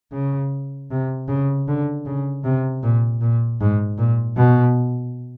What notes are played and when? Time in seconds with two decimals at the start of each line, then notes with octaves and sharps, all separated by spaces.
0.12 C#3
0.91 C3
1.28 C#3
1.68 D3
2.06 C#3
2.44 C3
2.83 A#2
3.21 A#2
3.61 G#2
3.98 A#2
4.37 B2